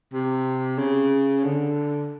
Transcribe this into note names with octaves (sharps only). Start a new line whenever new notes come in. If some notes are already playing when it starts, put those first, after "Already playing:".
C3
C#3
D3